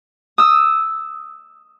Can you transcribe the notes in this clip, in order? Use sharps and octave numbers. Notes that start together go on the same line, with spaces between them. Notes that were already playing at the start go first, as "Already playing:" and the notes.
D#6 E6